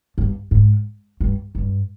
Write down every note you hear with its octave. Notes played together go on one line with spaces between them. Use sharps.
G2
G#2
G2
G2